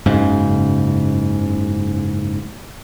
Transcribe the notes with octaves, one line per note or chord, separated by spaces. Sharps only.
F#1 G#2 C#3